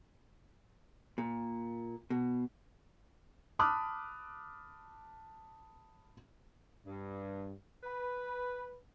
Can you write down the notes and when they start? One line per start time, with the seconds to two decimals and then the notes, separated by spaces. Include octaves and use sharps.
1.18 A#2
2.10 B2
3.59 A5 B5 D6 D#6 F6 F#6
6.87 G2
7.83 B4